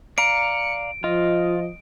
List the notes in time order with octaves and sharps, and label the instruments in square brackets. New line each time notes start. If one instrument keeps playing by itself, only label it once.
[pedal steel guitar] D5 F5 A#5 [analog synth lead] C#7 [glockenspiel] D7
[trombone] F3 [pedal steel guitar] F4 [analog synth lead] D#5